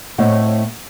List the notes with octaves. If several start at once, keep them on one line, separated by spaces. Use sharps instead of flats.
A2 A3 C4 C#5 D#5 F#5